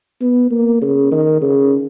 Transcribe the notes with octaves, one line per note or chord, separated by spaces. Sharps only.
B3
A#3
C#3
D#3
C#3